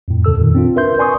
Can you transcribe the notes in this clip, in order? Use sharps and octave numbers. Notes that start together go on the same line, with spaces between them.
F2 A2
D#2 C#3 A4 E6
F2 A#2 D#3
C4 D4 F4
A#4 B4 E5 C6 G6
B4 D5 G#5 C6 C#6 D#6